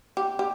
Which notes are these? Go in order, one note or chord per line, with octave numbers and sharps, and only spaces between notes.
G4
G4